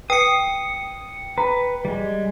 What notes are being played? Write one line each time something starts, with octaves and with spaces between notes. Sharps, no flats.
B4 G5 D#6 C#7
B4 A#5
G3 G#3